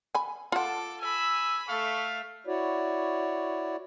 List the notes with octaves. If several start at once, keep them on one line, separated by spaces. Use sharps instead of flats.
G#5 B5
F4 A4 F#5 A5 D6
G#5 B5 E6
A3 A4 E5 F5 C#6
E4 F#4 C#5 D5